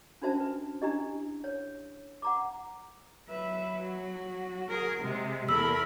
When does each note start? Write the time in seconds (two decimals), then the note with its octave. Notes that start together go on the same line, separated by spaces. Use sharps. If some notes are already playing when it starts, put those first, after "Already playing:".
0.22 C#4 D4 F#4 C5 E5 A5
0.40 B4
0.82 D4 E4 G4 D#5
1.44 C#5
2.22 F#5 A#5 D6
3.29 F#3 B4 E5
3.79 F#4
4.69 G#4 A#4
5.01 C3 G#3
5.49 E2 A4 A#4 B5 E6